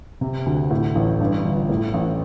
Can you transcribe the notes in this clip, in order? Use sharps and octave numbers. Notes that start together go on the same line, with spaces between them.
C3
D2
A2
A1
G2
G1
A2
A1